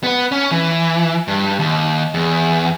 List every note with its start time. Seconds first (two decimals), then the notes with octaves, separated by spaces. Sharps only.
0.03 B3 B4
0.32 C#4
0.51 E3
1.28 G2
1.59 D#2
2.14 E2